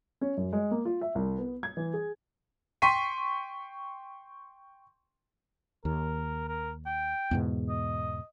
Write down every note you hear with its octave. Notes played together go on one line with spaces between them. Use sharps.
C#4
F#2
G#3
A#3
F4
E5
C2
B3
G#6
E3
G#4
G5 C6 C#6 B6 D#7
D#2 A#4
A#4
G5
E2 G#2 B2
D#5